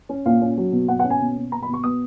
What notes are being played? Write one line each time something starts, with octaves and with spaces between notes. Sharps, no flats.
C#4
A#2 F5
C#4
F#3
B2
B2 F#5
F#5
C#4
G#5
B2
B2
B2 A#5
B5
B2
C#6
B3 D#6